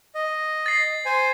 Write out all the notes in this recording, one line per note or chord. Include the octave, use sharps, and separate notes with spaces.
D#5
A6 C7
C5 G#5